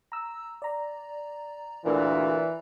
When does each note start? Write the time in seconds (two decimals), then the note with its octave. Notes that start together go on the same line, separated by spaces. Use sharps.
0.12 A#5 E6
0.62 D5 A#5
1.84 D2 A#2 E3